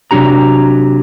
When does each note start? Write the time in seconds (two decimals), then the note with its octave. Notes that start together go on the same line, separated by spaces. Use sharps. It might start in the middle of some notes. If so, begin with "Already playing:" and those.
0.11 C3 F#3 D4 G4 A#5